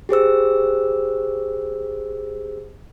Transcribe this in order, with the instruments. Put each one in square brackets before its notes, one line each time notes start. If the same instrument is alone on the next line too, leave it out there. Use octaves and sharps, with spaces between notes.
[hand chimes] G4 G#4 C5 E6